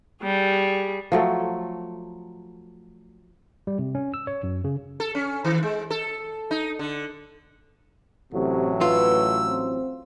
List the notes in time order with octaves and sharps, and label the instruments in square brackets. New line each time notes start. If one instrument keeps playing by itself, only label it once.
[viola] G3 G#4
[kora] F3 F#3 A3
[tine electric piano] G3
C3
C#4
E6
C#5
F#2
C#3
[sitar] A4
C#4
D#3
G#3
A4
D#4
D3
[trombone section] A1 A2 F#3 [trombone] C3
[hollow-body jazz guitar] F4 [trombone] B4 [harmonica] E6
[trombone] C4